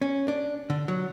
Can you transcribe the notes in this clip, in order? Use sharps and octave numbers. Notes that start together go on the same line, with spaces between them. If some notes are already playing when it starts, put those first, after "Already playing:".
C#4
D4
D3
F#3